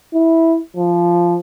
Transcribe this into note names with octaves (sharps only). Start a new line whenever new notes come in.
E4
F3